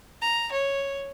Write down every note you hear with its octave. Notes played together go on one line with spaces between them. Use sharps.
A#5
C#5